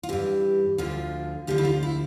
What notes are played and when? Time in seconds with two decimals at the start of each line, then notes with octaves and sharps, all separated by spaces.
0.03 F4
0.09 G2 E3 G4
0.78 D2 D3 F3 F4
1.47 D2 D3 F3 G4
1.58 E4
1.65 F4
1.83 E4